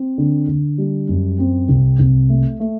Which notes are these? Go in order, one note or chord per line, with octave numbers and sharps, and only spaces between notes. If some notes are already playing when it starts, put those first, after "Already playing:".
Already playing: C4
D3
D3
G3
F#2
C4
C2
C2
A3
A3